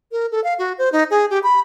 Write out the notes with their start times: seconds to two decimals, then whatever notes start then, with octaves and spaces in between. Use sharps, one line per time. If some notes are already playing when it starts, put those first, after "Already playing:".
0.12 A#4
0.31 A4
0.44 F5
0.59 F#4
0.78 C5
0.92 D#4
1.11 G#4
1.30 G4
1.43 B5